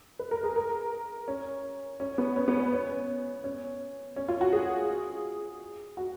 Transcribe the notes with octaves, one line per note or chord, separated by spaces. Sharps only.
B4
A#4
G#4
A#4
C#4
C#4
B3
C#4
B3
C#4
C#4
C#4
C#4
F4
F#4
G#4
F#4